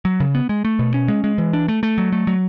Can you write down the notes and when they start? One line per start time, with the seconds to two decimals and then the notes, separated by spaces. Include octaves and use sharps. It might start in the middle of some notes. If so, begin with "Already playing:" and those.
0.05 F#3
0.20 C#3
0.35 B3
0.49 G#3
0.65 A3
0.79 B2
0.94 C#4
1.08 G#3
1.24 G#3
1.38 E3
1.53 D4
1.68 A3
1.83 A3
1.98 F#3
2.12 A3
2.27 F#3